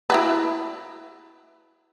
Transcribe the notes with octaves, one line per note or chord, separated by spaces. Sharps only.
E4 F#4 B4